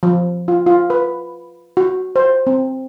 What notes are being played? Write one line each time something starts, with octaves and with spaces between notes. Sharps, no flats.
F3
F4
F4
B4
F#4
C5
C4